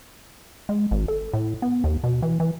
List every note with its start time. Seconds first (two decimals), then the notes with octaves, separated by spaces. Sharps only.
0.69 G#3
0.91 G#1
1.08 A4
1.33 A2
1.62 B3
1.84 D#2
2.04 B2
2.22 E3
2.40 E3